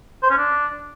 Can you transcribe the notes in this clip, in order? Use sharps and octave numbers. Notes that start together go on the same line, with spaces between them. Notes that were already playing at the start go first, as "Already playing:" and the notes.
C5
C#4
D4